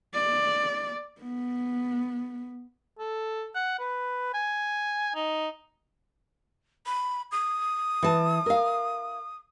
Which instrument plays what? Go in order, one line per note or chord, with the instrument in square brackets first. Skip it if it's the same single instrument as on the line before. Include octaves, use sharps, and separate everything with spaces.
[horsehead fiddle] D5
B3
[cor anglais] A4
F#5
B4
G#5
D#4
[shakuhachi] B5
D#6
[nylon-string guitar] E3 A5
A#4 F5